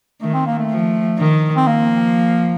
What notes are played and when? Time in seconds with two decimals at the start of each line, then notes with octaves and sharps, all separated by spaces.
0.22 D#3 A3
0.34 C4
0.46 A#3
0.58 A3
0.70 F3
1.19 D#3
1.56 C4
1.67 F3 A#3